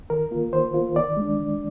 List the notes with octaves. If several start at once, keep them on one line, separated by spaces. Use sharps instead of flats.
D#3 A#4
A#3 F4
D#3 C5
A#3 F4
D#3 D5
G#3 D4
D#3